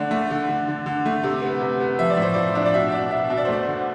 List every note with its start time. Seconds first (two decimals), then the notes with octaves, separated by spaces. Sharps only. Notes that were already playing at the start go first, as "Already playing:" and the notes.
Already playing: D3 A3 D5
0.11 A3
0.31 D3
0.49 D3
0.68 D3
0.86 D3
1.05 A3
1.23 C3
1.42 B3
1.61 C3
1.80 B3
1.99 F3 E5
2.10 D5
2.17 A2
2.22 C5
2.34 F3 D5
2.55 D4
2.66 D5
2.74 B2 E5
2.92 B2 D5
3.11 B2 E5
3.30 B2 E5
3.37 D5
3.45 C5
3.49 A3 D5
3.68 D3